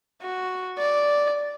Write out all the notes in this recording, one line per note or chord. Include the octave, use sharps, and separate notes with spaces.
F#4
D5